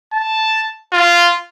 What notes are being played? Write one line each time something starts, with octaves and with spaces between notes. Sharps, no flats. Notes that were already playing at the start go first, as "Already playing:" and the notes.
A5
F4